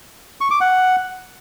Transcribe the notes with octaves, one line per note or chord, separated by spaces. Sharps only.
C#6
D6
F#5